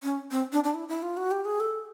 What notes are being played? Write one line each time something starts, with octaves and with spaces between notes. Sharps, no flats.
C#4
C4
D4
D4
E4
E4
F4
F#4
G4
G#4
A4